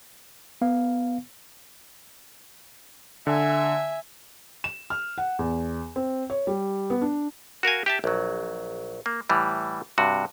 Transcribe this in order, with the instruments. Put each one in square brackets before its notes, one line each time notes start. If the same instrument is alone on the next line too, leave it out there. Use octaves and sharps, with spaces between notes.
[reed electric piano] B3 F5
[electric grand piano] D3 [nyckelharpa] E5 G#5
[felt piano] E7
F6
F#5
E2
C4
C#5
G3
B3
D4
[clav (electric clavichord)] F#4 A#4 F5 G#5
G4 E5 A5
A#1 F#3
A#3
A2 E3 G3
G2 C3 F#4